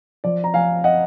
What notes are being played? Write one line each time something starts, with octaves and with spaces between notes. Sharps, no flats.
F3 D5
A#5
F3 F5 G#5
D#5 F#5